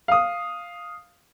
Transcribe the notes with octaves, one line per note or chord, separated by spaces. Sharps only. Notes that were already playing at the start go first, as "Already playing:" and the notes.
F5 D#6